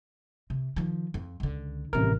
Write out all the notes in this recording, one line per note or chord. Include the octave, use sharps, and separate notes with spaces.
C3
D#3 F3
F2
C#2 D3
A1 G2 C3 D#3 A#4